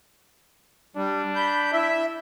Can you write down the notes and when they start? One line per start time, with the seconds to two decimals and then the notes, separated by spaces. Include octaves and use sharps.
0.96 G3 D4
1.35 B5 G6
1.73 E4 E5